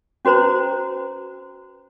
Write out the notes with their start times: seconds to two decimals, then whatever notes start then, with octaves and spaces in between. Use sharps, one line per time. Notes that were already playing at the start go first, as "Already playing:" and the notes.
0.25 C#4 F#4 B4 C5 A#5